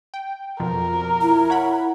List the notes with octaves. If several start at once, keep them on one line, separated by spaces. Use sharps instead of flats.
G5
F2 B2 F3 A#4
E4
C#5 F#5 B5